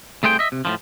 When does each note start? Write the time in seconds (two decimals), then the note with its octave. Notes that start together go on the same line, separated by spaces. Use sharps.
0.23 C2 A3 G#4 C5 G5
0.39 D#5 E5
0.52 C3
0.65 A2 E3 F3